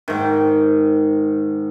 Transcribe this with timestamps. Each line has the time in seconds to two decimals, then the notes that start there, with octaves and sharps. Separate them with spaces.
0.08 G#2 D#3